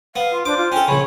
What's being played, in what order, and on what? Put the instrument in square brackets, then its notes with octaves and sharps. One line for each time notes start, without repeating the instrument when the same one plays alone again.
[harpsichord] B3 [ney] F5
[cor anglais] F4
[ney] D4 [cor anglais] C5 [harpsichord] D6
[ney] F4
[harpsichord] C#4 A4 [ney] G5
[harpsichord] A#1 C#3 [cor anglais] C#5 [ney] B5